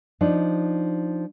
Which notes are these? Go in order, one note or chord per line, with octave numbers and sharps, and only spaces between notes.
F3 D4 D#4